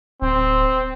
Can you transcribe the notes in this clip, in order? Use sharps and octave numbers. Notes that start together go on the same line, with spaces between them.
D1 C4